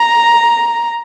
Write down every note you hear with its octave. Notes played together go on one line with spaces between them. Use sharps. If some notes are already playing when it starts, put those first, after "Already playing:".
Already playing: A#5